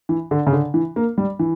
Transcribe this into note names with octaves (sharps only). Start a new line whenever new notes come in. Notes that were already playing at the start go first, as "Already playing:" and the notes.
E3
D3
C#3
D3
E3
A#3
G3
E3